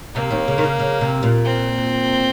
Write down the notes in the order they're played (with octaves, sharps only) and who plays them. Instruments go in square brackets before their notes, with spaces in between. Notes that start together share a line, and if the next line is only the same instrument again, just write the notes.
[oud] C3 [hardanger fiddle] A#3
[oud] D#2 D#3
C#3
D#3
C#3
C#3
C3
A#2
[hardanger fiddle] C4